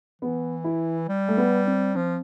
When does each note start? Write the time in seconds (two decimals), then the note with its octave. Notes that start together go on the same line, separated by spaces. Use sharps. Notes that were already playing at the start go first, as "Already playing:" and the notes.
0.22 E3 B3
0.64 E4
1.08 G3
1.28 A3
1.37 B3
1.67 C4
1.95 F3 C4